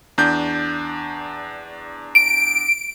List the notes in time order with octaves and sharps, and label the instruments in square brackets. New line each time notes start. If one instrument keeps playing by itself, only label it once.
[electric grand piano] E2 D4 G6
[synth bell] D7